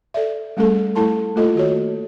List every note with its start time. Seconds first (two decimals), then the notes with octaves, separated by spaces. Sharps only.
0.14 A4 D5 E5
0.57 G3 A3 C#4 G#4 A4
0.95 A3 E4 A4 A5 C6
1.36 A3 A#3 F4 A4 D#5
1.55 D#3 F#4 C#5